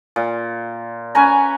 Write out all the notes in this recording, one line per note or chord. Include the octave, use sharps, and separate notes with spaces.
A#2
C#4 B4 G#5 A#5